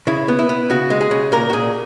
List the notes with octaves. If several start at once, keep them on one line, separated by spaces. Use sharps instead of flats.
C#3 E4
B3
E4
B3
C#3 F#4
G#3
G#4
C#3
A#2 A#4
F#4
A#2 G#4